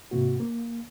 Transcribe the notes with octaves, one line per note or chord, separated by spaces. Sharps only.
G#2 C3 A#3 F#4
A#3